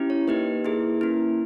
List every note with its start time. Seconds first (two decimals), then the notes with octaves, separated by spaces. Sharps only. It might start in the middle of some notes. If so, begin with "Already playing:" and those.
Already playing: C#4 E4 G4
0.10 C#5
0.28 A#3 D#4 G4 B4
0.65 A#3 E4 G#4
1.01 A#3 C#4 E4